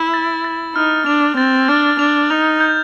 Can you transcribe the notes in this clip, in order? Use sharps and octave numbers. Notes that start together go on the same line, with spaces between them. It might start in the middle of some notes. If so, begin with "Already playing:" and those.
Already playing: E4
A6
A6
D#4 F6
D4 F7
C4 A6
D4 F6
D4 F7
D#4 F7
G6